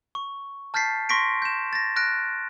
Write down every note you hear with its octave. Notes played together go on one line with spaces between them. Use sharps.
C#6
A5 F6 G6 A6 B6 C7
C6 C#6 A#6 B6 D7
G6 E7
A6 A#6
F6 F#6 A#6 D7